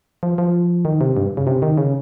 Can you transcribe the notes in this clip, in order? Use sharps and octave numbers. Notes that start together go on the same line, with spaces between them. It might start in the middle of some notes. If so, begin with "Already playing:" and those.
F3
F3
D#3
C3
G2
C#3
C3
D#3
C#3